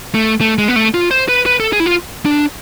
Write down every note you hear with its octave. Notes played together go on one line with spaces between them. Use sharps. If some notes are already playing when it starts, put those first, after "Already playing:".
A3
A3
G#3
B3
A3
F4
C5
B4
B4
A4
G#4
E4
F4
D4